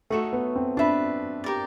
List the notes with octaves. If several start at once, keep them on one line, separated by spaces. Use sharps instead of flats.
A3 D#4 F#4 A4 C#5
B3
C4
D4 B4 E5 A5
G4 A#4 D5